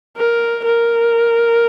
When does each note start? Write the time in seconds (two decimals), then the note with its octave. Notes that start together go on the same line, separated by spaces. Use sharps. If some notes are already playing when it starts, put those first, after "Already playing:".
0.17 A#4
0.65 A#4